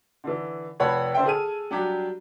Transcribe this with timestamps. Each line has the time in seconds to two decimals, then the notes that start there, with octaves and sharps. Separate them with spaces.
0.24 D3 E3
0.80 F1 C#5 F#5 A5 B5
1.14 D3 C5 E5 G5
1.26 G#4 A4 G#5 A5 F6 D#7
1.71 F#3 G3 D4 F#4 G4